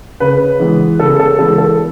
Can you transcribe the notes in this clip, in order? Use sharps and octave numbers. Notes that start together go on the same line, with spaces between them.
C#3 B4
E3 G#3 B3
C#3 A4
G#4
A4
E3 G#3 B3 A4
A4